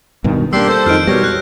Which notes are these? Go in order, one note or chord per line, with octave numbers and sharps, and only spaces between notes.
G2 B2 D#3
G3 A#3 D4 G4 C6 E6 C7
A4 C5 G6
F2 D#3 F6 G6 D7
B2 G3 C#5 A#6
F#6